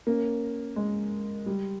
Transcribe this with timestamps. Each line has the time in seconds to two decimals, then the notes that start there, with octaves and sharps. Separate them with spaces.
0.07 A#3 C#4
0.76 G#3
1.46 G3